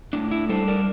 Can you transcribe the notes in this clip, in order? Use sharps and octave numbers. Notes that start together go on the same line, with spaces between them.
A2 D4
E4
G3 D4 A4 C5
A#4 D5